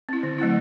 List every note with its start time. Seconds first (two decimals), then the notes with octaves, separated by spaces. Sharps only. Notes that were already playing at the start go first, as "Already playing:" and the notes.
0.09 C4 E4
0.23 D3
0.38 F#3 A3 C4 E4